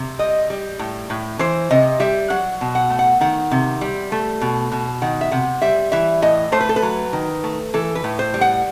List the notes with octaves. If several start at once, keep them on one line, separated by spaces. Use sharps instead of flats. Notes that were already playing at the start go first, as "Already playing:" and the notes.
Already playing: C3
G3 D#5
G3
A2
A2
E3 C5
C3 D#5
G3 E5
F#3 F#5
B2
F#5
A3
F#5
D#3 F#5
C3
G3
A3
B2
B2
D#3 F#5
E5
C3 F#5
G3 E5
E3 E5
A2 D#5
A3 C5
B4
A4
B4
F#3
D#3
A3
E3 A4
B4
A2
C5
G3
F#5